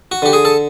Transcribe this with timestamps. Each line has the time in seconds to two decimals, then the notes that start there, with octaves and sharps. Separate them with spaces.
0.12 F#4
0.22 D3 G4
0.33 G#4
0.45 A4